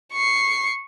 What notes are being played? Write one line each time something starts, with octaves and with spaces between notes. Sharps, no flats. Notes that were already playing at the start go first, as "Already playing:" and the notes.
C#6 C7